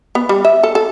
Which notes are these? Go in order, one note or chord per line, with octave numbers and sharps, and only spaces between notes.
B3
G3
E5
A4
A4